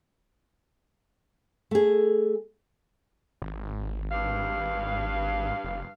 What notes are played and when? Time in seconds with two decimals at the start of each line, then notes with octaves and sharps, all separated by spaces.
1.71 A3 G#4
3.42 G#1
4.11 G2 F5
5.64 F1